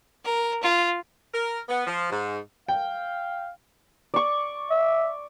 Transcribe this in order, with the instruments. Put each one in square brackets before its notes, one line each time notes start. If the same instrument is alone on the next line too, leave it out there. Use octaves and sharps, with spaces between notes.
[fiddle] A#4
F4
[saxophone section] A#4
B3
F3
G#2
[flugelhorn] F5 [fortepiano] G5
[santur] D5 C#6
[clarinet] E5